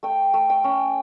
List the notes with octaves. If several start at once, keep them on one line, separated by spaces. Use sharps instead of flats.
A3 G5
A3
G5
C#4